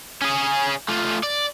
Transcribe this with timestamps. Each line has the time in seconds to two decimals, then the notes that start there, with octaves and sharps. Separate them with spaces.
0.22 C#4 G#4
0.89 A3 F4
1.23 D5